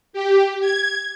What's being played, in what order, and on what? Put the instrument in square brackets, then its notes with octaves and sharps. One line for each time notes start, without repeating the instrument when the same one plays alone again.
[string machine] G4
G#6